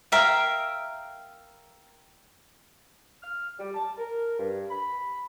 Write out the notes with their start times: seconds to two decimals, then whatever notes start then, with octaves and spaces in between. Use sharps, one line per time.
0.12 A#4 E5 F5 G5
3.22 F6
3.59 G3
3.74 A5
3.98 A#4
4.38 G2
4.70 B5